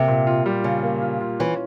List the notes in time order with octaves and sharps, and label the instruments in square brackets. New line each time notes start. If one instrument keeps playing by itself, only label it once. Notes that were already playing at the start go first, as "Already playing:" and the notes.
Already playing: [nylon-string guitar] C3 [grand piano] A#3
[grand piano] A#2
F4
G3
[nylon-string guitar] C#3 [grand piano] F4
[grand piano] A#3
F4
F4
[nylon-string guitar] E3 [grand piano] C#4